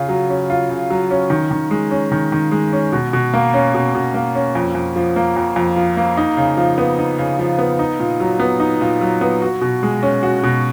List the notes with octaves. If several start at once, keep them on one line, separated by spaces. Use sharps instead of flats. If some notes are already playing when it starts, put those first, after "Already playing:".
Already playing: C#3 F4
F#3
C#4
F4
C#3
F#3
C#4
D#3
D#3
G#3
C#4
D#3
D#3
G#3
C#4
B2
B2
A#3
C#4
B2
B2
A#3
C#4
F2
F2
F3
A#3
F2
F2
F3
A#3
D#4
C#3
F3
B3
D#4
C#3
F3
B3
D#4
A#2
F#3
B3
D#4
A#2
F#3
B3
F#4
B2
G#3
C#4
F#4
B2